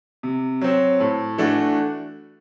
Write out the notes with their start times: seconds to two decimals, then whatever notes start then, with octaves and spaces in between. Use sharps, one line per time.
0.23 C3
0.61 F#3 C4
1.00 A2
1.38 E3 A3 D4 F#4